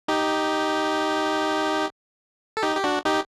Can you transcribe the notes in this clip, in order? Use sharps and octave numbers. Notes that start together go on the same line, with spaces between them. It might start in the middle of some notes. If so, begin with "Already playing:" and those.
D#4 G4
A4
D#4 G4
G4
D4 F#4
D#4 G4